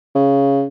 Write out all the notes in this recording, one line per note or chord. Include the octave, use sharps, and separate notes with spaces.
C#3